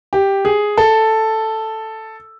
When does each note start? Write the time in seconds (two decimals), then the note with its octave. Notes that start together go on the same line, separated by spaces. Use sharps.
0.13 G4
0.45 G#4
0.77 A4